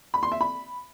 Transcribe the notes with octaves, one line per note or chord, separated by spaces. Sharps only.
B5
C6
E5
B5